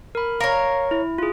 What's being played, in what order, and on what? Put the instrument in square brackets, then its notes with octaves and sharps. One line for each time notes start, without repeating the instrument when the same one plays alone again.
[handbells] A#4 B5
[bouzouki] A#4 C#5 [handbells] F5
[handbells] E4
F4 G#4